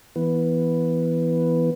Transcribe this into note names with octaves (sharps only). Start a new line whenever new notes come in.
E3 B3